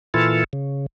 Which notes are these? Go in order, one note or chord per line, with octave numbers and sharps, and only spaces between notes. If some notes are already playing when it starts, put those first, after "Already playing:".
A#2 E3 E4 F4 A4
C#3